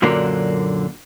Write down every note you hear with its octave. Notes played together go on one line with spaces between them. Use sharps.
F#2 A#2 D3 F#3 A#3 D4